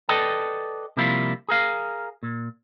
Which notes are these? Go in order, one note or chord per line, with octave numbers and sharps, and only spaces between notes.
A4 B4 D5 D#5 G5 A5
C3 F3 G3 A#3 E4 F4
G#4 A#4 F5
A#2